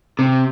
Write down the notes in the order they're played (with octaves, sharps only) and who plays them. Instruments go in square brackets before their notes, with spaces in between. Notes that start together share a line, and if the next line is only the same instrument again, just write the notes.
[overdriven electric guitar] C3